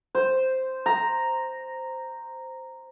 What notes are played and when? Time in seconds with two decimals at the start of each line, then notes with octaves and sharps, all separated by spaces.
0.15 C5
0.86 A#5